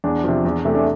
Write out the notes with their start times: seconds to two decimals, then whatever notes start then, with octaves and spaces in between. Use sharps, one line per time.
0.04 E2 D4
0.24 C3 F3
0.45 E2
0.65 C3 E3 A3
0.75 D4